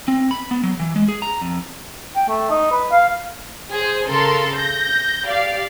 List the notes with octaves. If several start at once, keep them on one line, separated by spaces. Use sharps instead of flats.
C4
B5
B3
F#3
E3
G#3
G#4
A#5
F2
G5
A3
D#4
B4
F5
G#4 C5
C#3 A4 A#4 C6
G6 A#6
G4 D5 F5